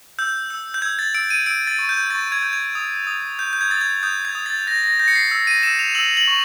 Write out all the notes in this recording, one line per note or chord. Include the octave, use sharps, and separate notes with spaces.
E6 G6
E6
G6
E6 G#6
A6
E6 D7
D#7
E6 D7
A6
C#6
G6
C#6 A6
G#6
G6
G#6
D#6
D#6
G6
G6
G#6
D#6 A6
G#6
D#6 G6
G#6
D#6
A6
G6 A#6
A#6
G6 A#6
C#7
C7
E6
D#7
E6 E7
F7
E6 F#7
F#7
C#6